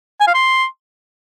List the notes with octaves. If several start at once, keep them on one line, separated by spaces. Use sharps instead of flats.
G#5
F5
C6